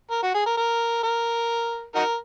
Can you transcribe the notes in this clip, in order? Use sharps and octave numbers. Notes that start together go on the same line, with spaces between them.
A#4
F#4
G#4
A#4
A#4
A#4
D#4 F#4 A#4